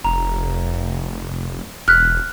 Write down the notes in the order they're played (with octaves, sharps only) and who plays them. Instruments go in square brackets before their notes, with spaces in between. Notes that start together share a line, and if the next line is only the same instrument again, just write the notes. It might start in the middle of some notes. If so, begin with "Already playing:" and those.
[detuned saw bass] F1 [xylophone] A#5
[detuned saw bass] E1 [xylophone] F6 F#6 B6